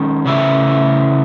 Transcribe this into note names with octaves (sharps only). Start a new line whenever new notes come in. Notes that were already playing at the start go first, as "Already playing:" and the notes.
Already playing: D#3 G#3 C#4
C#3 E3 A3 E4